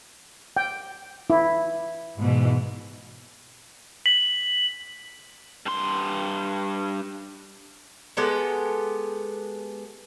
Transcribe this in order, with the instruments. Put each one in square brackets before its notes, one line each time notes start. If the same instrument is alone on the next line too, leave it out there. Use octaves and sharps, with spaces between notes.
[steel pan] G5
E4
[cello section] G#2 B2 E3
[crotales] B6 F#7
[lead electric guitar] G2 C6
[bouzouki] G#3 B3 G4 A4